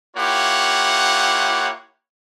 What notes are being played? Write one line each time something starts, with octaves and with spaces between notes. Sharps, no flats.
A#3 E4 F4 G4 C#5 F#5